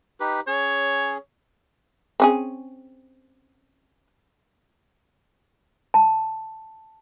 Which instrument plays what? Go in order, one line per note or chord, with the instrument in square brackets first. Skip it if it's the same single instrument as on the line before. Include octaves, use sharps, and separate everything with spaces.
[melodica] D#4 G4 B4
[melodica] C#4 G#4 [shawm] C#5
[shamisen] C4 C#4 G#4
[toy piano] A5